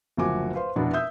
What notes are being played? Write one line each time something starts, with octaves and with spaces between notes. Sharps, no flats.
F#1 D2 F3 F#4 G#5 D6
B4 C5 F5 C6
F1 B2 B3 D4 E4 F#4
E5 D#6 E6 G6